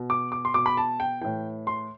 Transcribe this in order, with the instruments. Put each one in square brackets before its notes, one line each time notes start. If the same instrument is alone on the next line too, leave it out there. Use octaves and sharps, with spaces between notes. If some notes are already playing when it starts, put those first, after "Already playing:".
Already playing: [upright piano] B2
D6
D6
C6
B2 D6
B5
A5
G5
A2 E3 G5
C6